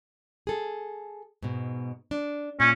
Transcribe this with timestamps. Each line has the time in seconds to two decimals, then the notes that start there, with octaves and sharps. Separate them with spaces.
0.47 G#4 A4
1.42 G#2 B2
2.11 D4
2.60 A#2 C#4